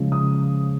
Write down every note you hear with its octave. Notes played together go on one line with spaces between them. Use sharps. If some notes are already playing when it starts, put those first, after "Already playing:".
Already playing: C#3 F3 G#3
D#6